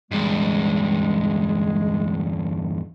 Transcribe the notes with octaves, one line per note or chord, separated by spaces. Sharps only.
E2 G2 G#3